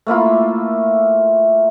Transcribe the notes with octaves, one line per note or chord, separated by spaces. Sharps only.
A3 A#3 E4 F4